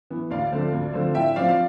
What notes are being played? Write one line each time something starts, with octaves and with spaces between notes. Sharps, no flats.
E3 B3
D2 D5 F5
D3 F3 A3 C4
D2
D3 F3 A3 C4
A2 E5 G5
F3 C4 D5 F5
F5